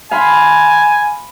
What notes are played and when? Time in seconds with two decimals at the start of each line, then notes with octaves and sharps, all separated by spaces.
0.12 F5 G#5 B5 C6